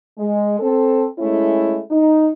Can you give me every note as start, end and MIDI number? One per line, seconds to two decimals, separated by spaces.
0.18 0.58 56
0.59 1.05 60
0.59 1.05 69
1.19 1.79 56
1.19 1.79 57
1.19 1.79 61
1.19 1.79 64
1.91 2.30 63